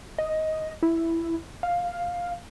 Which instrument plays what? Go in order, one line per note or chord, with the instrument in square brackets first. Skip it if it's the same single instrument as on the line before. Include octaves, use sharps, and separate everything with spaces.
[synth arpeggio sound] D#5
E4
F5